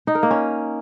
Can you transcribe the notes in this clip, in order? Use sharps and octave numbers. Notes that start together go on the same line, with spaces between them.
D#4
A#4
A#3
C#4